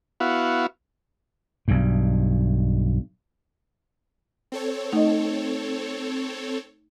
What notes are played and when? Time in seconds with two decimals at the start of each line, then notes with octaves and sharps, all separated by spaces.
0.20 B3 E4 F#4 F5
1.68 B1 G2
4.52 C4 A4 C#5
4.93 A3 D#4 D#5